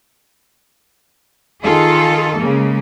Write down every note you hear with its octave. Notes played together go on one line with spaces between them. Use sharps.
D#3 F4 G#4 A4
C#3 G#3 A#3